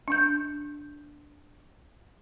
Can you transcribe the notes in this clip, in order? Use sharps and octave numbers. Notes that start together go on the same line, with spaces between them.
D4 G6